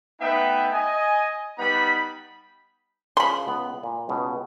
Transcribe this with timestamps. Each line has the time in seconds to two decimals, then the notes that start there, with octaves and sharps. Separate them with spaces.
0.21 A3 B3 D#4 B4 E5 G5
0.73 D#5 G#5
1.58 G3 B3 D#4 B4 B5
3.17 C#3 F3 B5 C6
3.47 C#2 B3
3.83 A#2
4.09 C#2 B2